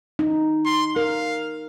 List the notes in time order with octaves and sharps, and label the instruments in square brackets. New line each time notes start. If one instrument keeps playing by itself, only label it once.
[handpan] D#4
[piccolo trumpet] C6
[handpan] A#4 [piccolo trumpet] F5